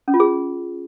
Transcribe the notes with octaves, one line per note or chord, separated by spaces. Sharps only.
C#4
F4
G#4